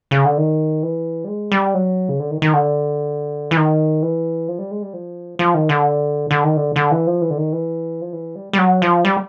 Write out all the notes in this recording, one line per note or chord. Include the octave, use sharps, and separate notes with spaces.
C#3
D3
D#3
E3
G3
G#3
G3
F#3
C#3
D3
D#3
D#3
D3
E3
D#3
E3
F3
G3
G#3
G3
F3
F3
D#3
D3
D3
D#3
D3
D3
E3
F3
E3
D3
D#3
E3
F3
E3
G3
G3
F#3
F3
G3